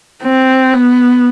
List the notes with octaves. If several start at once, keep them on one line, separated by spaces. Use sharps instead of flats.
C4
B3